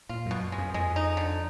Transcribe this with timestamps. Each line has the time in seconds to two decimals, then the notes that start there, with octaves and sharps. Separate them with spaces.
0.09 A#2 F4
0.26 F#2
0.31 B2
0.52 G#3
0.58 F#2
0.74 F2 G#3
0.96 D#4
1.17 D3